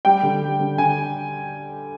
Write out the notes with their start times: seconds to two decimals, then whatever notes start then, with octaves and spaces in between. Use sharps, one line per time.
0.05 G3 G5
0.23 D3
0.42 G3
0.60 D3
0.78 D3 G#5